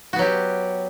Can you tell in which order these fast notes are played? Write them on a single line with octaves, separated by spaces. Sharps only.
F#4 B3 F#3 G4